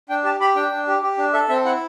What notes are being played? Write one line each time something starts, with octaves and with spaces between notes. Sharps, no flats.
D4 G5
G4 A5
G4 B5
D4 G5
D4
G4
G4
D4
A4 E5
C4 E5
E4 F#5